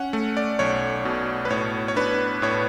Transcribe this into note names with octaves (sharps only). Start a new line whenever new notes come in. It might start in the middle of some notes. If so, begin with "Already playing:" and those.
Already playing: C#4 F#5
A3
D5
B1 C#5
B2
B4
A2 C#5
C#5
D4 B4
A2 C#5